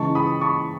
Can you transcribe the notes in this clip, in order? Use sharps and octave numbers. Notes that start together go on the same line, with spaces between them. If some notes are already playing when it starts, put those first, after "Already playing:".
Already playing: C#3 E3 G#3 D#4 A5 C#6
B5 D#6
A5 C#6